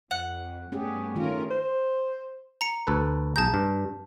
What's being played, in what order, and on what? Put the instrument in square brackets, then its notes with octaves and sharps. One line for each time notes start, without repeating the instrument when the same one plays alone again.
[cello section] F2 [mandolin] F#5
[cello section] G2 A3 B3 [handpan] C#4 G4 G#4
[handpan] D#3 A3 F4 [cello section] C#4 A#4
[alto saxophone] C5
[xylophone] A#5 C#7
[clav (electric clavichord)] D2 A4 B4
[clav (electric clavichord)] B1 G#4 A#5 [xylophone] A5 G6
[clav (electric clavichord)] G2